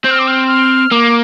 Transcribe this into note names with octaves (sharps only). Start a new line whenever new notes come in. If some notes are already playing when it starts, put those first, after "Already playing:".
C4 G6
F6
D6
F6
F6
A#3 D6